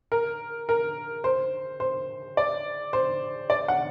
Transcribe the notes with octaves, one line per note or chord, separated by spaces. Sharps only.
A#4
A#4
C5
C5
D5
C5
D5
F#5